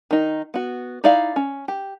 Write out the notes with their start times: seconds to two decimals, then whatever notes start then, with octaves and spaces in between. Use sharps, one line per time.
0.11 D#3 D#4
0.54 B3 F#4
1.04 D#4 E4 D5 E5 F5
1.36 C#4
1.68 G4